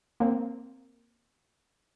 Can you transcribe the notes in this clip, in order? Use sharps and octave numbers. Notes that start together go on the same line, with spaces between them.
A#3 C4